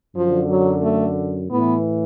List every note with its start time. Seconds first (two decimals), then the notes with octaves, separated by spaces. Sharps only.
0.15 F#2 D3 F3
0.50 F#3
0.83 A3
1.51 A2 E3 B3